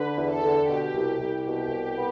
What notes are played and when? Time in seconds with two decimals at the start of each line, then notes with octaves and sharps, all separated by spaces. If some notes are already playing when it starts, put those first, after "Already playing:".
Already playing: D3 B4
0.18 E2
0.31 A4
0.43 D3
0.68 B2 G4
0.94 C2
1.19 C2
1.44 B2 G4
1.69 C2
1.95 B3